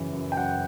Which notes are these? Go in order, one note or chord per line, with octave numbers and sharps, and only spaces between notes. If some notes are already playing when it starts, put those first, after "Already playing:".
Already playing: F#2 C#3 E3
F#2
G5
F#2 F#5